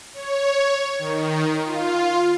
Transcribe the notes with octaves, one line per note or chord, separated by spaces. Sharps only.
C#5
D#3
F4